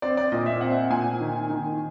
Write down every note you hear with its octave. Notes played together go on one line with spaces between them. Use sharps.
C4 D5
D5
A#2 D#5
E5
C4 F#5
A#2 G#5
D#3
D#3